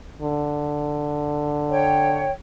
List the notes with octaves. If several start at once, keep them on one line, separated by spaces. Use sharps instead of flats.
D3
C#5 G5